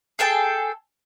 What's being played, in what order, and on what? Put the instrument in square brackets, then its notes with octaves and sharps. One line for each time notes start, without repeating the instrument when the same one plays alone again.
[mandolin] G#4 A4 G5 A5